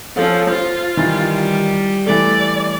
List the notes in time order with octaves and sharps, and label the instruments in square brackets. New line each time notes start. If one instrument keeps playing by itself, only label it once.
[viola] F3 [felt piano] C#4 A4 F5
[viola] F4 [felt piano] C5
[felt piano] D#3 E3 A6 [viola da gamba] G3
[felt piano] E3 A3 A4 [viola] D5